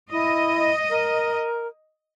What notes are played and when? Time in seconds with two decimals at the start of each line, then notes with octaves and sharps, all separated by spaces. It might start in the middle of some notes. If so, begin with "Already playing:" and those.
0.11 E4 D#5
0.89 A#4